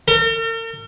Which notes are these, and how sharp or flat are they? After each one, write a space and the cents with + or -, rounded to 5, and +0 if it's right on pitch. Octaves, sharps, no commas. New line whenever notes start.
A#4 -45